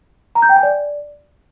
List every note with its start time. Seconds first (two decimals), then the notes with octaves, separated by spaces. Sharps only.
0.35 A#5
0.42 G6
0.49 G5
0.56 G#5
0.63 D5